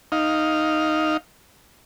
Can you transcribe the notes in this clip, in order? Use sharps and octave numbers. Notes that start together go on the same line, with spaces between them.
D#4 F5